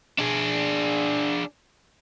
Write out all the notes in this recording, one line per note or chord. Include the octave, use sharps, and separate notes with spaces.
D4 G#4